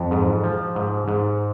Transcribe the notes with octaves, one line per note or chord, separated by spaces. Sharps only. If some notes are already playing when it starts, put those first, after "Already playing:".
Already playing: F2
G#2
F3
G#2
G#2